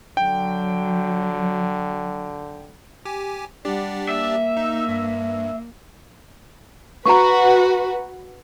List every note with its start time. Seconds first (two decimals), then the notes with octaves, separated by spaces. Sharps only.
0.17 D3 F#3 G5
3.05 G4 G#5
3.65 G3 D4 G4 D5 F#5
4.09 A#3 E5
4.57 D#4
4.89 G2
7.06 F#4 B4 A#5 C#6